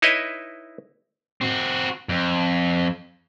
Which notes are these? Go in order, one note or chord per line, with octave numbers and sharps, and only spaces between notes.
D#4 E4 B4 C#5 D#5 E5
C4 F#4
F2